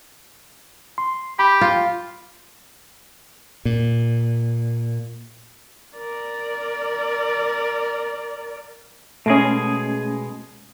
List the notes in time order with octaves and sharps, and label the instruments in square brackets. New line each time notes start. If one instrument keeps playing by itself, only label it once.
[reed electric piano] C6
[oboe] G4 [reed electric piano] B5
[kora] F4
[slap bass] A#2
[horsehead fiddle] A#4 D5
[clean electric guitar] B2 G#3 G#4 [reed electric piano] A3 C#4